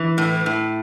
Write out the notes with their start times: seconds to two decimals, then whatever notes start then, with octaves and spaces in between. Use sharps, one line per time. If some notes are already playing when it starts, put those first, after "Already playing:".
Already playing: E3
0.18 A2
0.46 A2